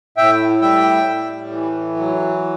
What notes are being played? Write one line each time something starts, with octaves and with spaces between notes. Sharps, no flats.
A2 E5 G5
G3 E5 G5
A2
E3
F#3